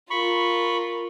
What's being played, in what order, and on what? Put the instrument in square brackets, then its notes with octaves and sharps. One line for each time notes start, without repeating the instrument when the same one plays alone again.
[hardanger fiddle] F4 A#4 [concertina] B5 C#6